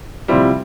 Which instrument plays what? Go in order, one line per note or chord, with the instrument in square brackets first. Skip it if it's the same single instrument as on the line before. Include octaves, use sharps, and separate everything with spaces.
[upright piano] C3 F3 C4 E4 [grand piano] G3